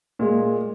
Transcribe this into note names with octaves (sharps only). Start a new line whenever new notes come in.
A#2 G#3